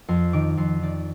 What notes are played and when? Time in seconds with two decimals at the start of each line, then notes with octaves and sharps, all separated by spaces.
0.08 F2 C6
0.33 D#3 D6
0.57 F2 C6
0.82 D#3 D5